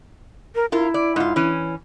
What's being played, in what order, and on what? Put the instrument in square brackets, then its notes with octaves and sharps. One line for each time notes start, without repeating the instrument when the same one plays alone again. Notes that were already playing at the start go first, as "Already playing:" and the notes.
[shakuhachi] A#4
[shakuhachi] E4 [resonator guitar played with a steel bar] F4 A#4
[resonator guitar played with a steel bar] D5
G#2 F4
E3 C#4